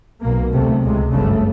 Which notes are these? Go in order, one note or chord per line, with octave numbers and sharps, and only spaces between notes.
B1 B2 A#3
D2 C3 A3
C#2 C3 G#3
G1 F#2 C#3 A3